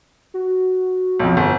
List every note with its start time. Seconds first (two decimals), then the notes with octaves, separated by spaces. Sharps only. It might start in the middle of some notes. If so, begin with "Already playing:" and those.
0.34 F#4
1.20 B1 F2
1.37 G1